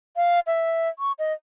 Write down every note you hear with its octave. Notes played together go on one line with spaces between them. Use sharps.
F5
E5
C#6
D#5